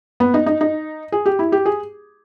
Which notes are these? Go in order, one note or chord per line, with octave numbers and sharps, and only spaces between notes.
B3
D#4
D#4
D#4
G#4
G4
E4
G4
G#4